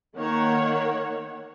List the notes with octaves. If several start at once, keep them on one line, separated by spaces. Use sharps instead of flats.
D#3 A#3 C#5 F#5